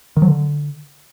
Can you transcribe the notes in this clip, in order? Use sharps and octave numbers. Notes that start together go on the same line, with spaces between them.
D#3
F#3
D3